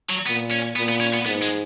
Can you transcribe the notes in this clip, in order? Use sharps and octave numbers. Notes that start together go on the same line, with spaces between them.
F#3
A#2 B3
C#4
A#2 B3
B3
C#4
B3
G#2 B3
G#3